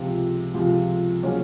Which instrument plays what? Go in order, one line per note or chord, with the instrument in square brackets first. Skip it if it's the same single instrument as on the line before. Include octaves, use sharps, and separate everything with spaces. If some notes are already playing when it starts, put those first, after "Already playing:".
Already playing: [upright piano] C#2 C3 F3
C#2 C3 F3
C#3 F#3 A#3 C#4 F4